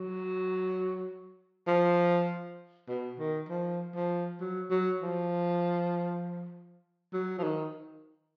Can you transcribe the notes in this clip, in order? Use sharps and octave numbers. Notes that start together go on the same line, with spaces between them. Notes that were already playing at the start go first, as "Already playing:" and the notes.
Already playing: F#3
F3
B2
D#3
F3
F3
F#3
F#3
F3
F#3
F3
D#3